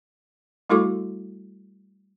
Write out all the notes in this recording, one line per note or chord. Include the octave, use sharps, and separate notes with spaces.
G3 A3 E4 F#4 A4 D6